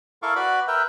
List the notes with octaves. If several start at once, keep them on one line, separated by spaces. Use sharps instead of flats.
E4 A4 A#4 F5 C#6 D6
F#4 B4 D5 B5 D6
A#4 B4 E5 G5